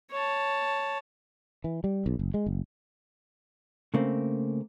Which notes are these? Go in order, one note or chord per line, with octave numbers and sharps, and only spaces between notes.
C#5 A5
E3
G3
B1
F#1
G#3
F#1
C#3 A3 A#3 C4